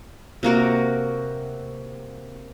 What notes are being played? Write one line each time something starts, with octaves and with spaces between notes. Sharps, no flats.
C3 A#3 F#4 A#4